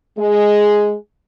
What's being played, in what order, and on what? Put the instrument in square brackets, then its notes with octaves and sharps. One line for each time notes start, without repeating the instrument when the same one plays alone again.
[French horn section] G#3 G#4